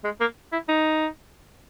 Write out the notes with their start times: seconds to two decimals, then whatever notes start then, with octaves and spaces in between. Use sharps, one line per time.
0.04 G#3
0.21 A#3
0.52 E4
0.69 D#4